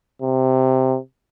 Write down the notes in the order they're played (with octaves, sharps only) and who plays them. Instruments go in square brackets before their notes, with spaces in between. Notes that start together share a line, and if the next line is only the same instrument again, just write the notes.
[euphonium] C3